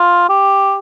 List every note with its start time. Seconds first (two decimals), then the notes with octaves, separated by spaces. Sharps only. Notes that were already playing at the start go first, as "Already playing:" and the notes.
Already playing: F4
0.29 G4